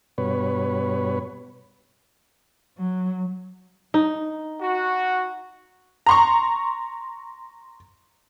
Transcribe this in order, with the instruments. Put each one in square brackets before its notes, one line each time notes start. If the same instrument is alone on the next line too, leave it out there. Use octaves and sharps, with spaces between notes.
[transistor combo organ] G2 B2 B4 C#5
[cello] F#3
[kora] D#4
[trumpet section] F#4
[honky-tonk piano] A#5 C6 C#6